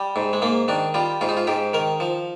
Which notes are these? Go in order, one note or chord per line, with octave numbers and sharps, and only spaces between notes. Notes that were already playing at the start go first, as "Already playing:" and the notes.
Already playing: G3
G#2
G#3
G#2 A#3
D#3 D4
G3 F4
G#2 F4
D#4
F4
G#2 G4
D#3 A#4
F3